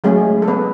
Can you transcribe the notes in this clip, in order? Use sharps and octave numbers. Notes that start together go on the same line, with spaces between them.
F#3 G#3 A3 C#4 G#4
A4
B3 B4